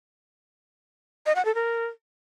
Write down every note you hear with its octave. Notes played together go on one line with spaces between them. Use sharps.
D#5
F#5
A4
A#4